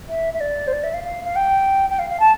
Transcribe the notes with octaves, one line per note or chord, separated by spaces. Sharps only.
E5
E5
D5
C5
D5
E5
F5
F5
F5
G5
G5
F5
F5
A5